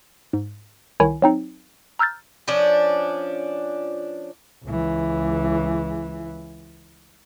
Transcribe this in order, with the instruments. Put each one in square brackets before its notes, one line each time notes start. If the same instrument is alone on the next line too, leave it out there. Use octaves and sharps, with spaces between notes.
[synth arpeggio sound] G#2
C2 D#3 E4 C#5 G#5
F#3 C4 D#4
A#5 E6 F6 G6 A6
[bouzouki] F3 C#4 D4
[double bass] C#2 E3